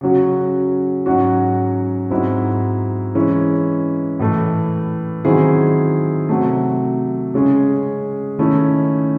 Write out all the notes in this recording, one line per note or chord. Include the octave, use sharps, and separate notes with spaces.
C#3 F#3 C#4 F#4
G#2 F#3 C#4 F#4
G#2 F#3 C4 E4
E3 G#3 C#4 E4
A2 E3 A3
D#3 F#3 C4 E4 G#4
C3 F#3 A3
C#3 G#3 C#4 G#4
D#3 A3 C#4 E4